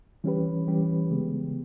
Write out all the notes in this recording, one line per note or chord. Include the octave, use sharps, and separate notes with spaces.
E3 G3 C#4 G4 B4
E3 G3 C#4 G4 B4
C#3 G#3 B3